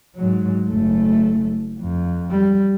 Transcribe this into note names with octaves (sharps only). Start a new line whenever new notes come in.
G#2 F#3
F#1 A3
F2
G3